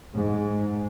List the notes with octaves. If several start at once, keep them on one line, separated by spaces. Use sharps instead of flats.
G#2